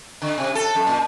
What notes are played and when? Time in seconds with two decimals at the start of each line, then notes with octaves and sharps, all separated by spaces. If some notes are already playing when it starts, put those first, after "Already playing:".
0.22 D3
0.38 C3
0.55 A4
0.75 F#2
0.87 A#2